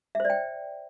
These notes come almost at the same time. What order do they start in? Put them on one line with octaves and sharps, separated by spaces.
E5 C5 D5 G5